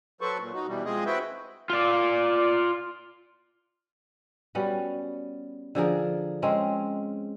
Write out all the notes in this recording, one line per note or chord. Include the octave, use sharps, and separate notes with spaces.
F#3 A4 B4 C5 C#6
A#2
D#4 F#4
B2 E3 G3
F3 G#3 C4 G#4 D#5
C4 E4 F#4 B4 E5 G5
F4 D5
G3 B3 C#4 F#4
D3 F3 G#4 A#4
G#3 C4 C#4 A#4